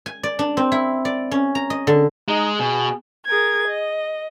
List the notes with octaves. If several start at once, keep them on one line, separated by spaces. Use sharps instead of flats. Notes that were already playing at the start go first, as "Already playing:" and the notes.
G#5
D5
D4
C4
E4
D5
C#4
A#5
D#5
D3
G#3 D#4
B2 G#4
G#4 A#4 G#6
D#5